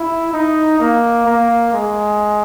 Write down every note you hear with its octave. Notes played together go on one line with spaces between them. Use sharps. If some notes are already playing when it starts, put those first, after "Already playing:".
Already playing: E4
D#4
A#3
A#3
G#3